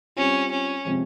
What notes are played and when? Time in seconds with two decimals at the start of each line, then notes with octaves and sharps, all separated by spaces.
0.16 G3 C4 C#4 F4
0.51 C#4
0.85 C3 F3 G#3 C4